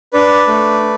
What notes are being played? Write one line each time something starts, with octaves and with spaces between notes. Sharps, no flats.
D4 B4 D5
A3